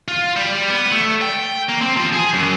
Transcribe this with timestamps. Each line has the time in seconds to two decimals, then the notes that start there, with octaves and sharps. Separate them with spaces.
0.08 F4
0.36 G3
0.70 B3
0.92 A3
1.22 G5
1.69 A#3
1.81 C4
1.97 F3
2.13 G#4
2.34 F#2